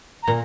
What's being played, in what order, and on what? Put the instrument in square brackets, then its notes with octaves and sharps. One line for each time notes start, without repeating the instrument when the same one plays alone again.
[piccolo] A#5
[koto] A#2